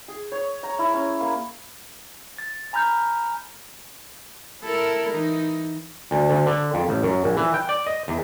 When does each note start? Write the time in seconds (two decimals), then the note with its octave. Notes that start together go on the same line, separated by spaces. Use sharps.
0.08 G#4
0.32 C#5
0.63 A#5
0.79 E4
0.94 C#4
1.20 A#3
2.38 A6
2.73 G#5 A#5 B5 F6 G6
4.62 E4 A4 A#4
5.10 E3 D#4
6.11 D2
6.29 D2
6.46 D3
6.74 F2
6.89 A1
7.03 F#2
7.24 A#1
7.37 E3
7.54 G5
7.69 D5
7.86 D#5
8.08 E2